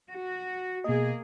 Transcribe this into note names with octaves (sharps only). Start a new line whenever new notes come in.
F#4
B2 A#3 G#4 D#5